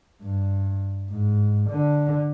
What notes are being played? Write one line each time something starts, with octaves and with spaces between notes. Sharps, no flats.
G2
G#2
D3